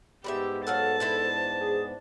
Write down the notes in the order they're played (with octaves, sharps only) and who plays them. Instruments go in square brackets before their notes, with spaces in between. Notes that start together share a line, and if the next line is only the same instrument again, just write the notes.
[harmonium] G#2 B3 [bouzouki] G3 G#3 E5 [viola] G4
[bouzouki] F#3 F5 F#5 [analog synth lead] A4 [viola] A5
[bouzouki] D4 E4 C5
[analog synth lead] G#4